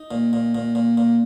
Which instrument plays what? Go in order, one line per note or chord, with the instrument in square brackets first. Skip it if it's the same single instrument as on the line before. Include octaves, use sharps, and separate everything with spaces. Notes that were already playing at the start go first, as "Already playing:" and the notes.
Already playing: [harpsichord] D#4
A#2
A#2
A#2
A#2
A#2